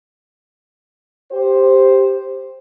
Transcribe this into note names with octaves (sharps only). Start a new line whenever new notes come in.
G4 C5